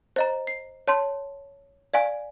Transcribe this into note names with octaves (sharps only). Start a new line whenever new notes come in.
C5 D#5 A#5
C7
C#5 A5 C6
D5 F5 G#5